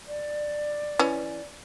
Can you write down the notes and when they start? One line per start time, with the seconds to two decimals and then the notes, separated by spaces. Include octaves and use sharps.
0.07 D5
0.99 E3 C#4